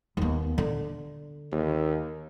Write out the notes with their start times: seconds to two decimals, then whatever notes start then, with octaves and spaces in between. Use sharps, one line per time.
0.17 D#2 B3
0.58 D3
1.52 D#2